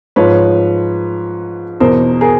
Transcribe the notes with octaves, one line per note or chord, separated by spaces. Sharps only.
G#2 F3 B4 C#5
E2 B2 A#4 C5
G#4 A#4